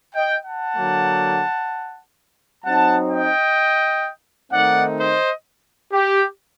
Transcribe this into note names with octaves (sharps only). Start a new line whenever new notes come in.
D#5 G5
F#5 A5
D3 F#3 A#3
F#3 C4 D#4 F#5 A5
D#5 G5
D#3 A3 C4 D#4 D5 F#5
C5 D#5
G4